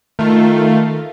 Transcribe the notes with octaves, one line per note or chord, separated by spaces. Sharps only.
D#3 A3 F4